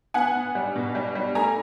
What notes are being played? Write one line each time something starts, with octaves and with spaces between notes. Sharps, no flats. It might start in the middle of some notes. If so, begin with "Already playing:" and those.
B3 F#5 G#5
B3
G3
B2
G3
G3
A3 G#5 A#5